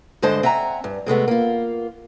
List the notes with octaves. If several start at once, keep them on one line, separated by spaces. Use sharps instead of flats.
G2 D3 G#3 C5 D#5 A5
C4 E5 F#5 G#5 A#5
G2
C3 G#3 A3 B3
A#3 F4